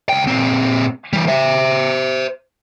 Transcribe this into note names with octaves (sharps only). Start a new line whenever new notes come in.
C#2 G5
A#2 C4
E3 G3
C5 E5